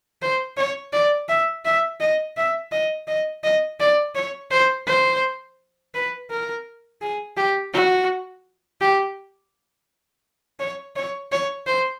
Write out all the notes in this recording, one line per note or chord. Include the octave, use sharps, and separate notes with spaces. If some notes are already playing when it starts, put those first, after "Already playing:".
C5
C#5
D5
E5
E5
D#5
E5
D#5
D#5
D#5
D5
C#5
C5
C5
B4
A#4
G#4
G4
F#4
G4
C#5
C#5
C#5
C5